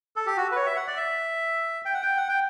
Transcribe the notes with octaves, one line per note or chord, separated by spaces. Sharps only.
A4
G4
F#4
B4
C#5
E5
F#5
D5
E5
G5
F#5
G5
F#5
G5